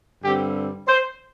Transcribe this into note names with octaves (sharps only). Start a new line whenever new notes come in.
G2 D3 G3 C4 G4
C5